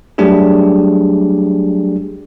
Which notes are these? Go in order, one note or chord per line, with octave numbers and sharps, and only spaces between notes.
F#3 G3 A3 D4 G4 G#4